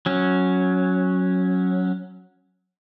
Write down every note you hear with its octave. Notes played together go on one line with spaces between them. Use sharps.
F#3 C#4